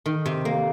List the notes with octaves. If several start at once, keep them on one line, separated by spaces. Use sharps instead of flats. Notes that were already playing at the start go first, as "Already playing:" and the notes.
D#3
C3
A#3